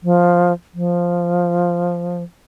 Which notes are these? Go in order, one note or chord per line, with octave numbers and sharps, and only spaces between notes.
F3
F3